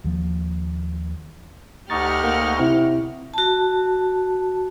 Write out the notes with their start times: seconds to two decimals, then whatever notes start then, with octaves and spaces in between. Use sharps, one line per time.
0.04 D#2 F3 A#3
1.90 D2 D#4 G4 F#5 C#6 F6 A6
2.24 A#3
2.59 C3 C4 E4
3.34 F#4 A5